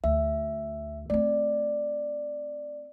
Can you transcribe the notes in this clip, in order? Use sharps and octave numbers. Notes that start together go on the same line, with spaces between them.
D2 E5
A3 C4 D5